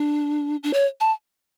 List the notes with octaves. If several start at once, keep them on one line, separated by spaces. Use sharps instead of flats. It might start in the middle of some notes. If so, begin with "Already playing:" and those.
Already playing: D4
D4
C#5
A5